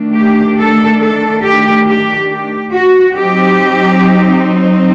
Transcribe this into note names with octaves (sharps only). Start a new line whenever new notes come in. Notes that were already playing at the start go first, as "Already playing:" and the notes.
Already playing: D#3 A3 D4
G4
A4
A4
G4
G4
G4
F#4
F#3 C4 D#4 G4